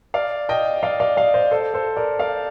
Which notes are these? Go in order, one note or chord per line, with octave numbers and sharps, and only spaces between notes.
D5 F5
D#5 G5
D5 F5
D5 F5
D5 F5
C5 D#5
A4 C5
A4 C5
A#4 D5
D5 F5